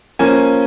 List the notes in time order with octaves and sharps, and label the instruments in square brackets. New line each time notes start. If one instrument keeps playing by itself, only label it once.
[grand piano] F3 A#3 C#4 G#5